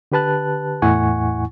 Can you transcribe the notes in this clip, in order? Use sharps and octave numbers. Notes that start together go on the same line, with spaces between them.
D3 G4 B4 A5 F#6
E2 A2 E4 F#5 G#5 C#6